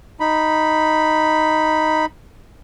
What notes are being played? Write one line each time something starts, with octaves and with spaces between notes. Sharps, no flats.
D#4 B5